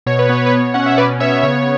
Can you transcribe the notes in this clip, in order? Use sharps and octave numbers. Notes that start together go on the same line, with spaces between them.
B2 C#5
B4
B3 C#5
B4
B2 C#5
C#4 F#5
E5
B2 B4 D5
B3 C#5 E5
C#3 C#5